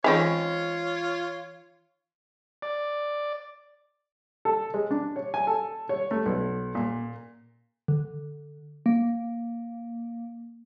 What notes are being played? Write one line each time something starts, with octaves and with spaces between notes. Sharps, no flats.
E3 G#3 C4 C#4 D#4 F4 C#5
D5
A4
G#3
D4
C#5
G#5
A4
C#5
A3
B1
A#2
D3
A#3